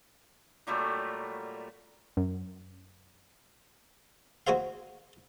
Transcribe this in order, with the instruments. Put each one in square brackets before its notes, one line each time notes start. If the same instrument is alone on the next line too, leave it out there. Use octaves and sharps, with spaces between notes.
[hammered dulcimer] A#2 F#3 G3 A3
[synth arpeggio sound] F#2
[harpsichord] D2 F#4 G#4 C5 F5